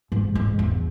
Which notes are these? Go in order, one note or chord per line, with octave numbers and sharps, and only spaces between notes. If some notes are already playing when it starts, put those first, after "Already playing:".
G#2
G#2
E2